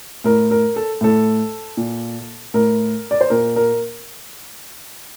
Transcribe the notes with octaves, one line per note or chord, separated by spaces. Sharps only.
A2 A#4
A#4
A4
A2 A4
A#2
A2 A#4
D5
C5
A#2 A#4
A#4